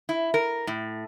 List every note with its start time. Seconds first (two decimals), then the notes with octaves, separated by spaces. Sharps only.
0.09 E4
0.34 A#4
0.67 A2